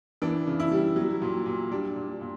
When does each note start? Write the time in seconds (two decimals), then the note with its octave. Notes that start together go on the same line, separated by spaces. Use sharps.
0.22 E3 D4
0.47 C#3
0.60 E4
0.71 G3
0.96 F#3
1.22 A#2
1.46 A#2
1.71 G3 D4
1.96 A#2
2.21 A#2